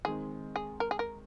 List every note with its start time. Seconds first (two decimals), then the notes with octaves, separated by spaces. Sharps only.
0.05 D#3 G#3 C4 G#4
0.56 G#4
0.80 A#4
0.91 G#4
0.99 A#4